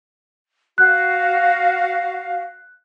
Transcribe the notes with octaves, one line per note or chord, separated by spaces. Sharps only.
F#4 F5 F#6